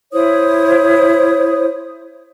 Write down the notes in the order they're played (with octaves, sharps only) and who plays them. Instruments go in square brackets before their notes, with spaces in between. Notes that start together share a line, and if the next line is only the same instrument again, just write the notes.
[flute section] E4 C5 C#5 D#6